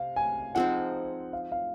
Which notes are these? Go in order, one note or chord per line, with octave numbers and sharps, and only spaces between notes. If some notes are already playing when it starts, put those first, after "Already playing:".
Already playing: C3 F5
G#5
F3 G#3 C4 D#4 F#5
F5
F5